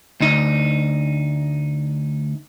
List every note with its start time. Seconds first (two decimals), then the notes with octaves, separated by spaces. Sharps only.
0.20 D2 D#4